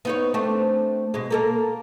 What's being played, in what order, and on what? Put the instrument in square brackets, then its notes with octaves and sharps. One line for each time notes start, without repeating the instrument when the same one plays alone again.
[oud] B3 D#4 C#5
A3 C4 D4
B2 G#3
A#3 A4 A#4